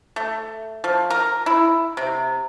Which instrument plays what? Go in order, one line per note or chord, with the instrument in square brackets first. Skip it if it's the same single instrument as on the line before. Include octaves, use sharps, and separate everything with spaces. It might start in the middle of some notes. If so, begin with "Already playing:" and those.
[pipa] A3
F3
A#4
E4
C3